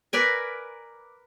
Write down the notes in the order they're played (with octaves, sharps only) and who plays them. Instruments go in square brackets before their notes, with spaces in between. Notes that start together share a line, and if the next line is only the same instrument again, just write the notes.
[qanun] A#4 B4 D5 G#5